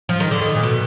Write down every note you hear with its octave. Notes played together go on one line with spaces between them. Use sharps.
F3
D#3
D3
D#3
A#2
B2